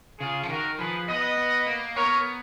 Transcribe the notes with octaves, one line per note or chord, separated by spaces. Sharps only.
C#3 F4 G#4
F3
D#3 F#4 A#4
F3 G#4 B4
B3 B4 D#5
B3
A#3
B3 A#4 C#5